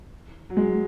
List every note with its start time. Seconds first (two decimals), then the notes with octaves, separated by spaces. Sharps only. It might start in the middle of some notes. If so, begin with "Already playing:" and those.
0.50 F#3
0.57 G#3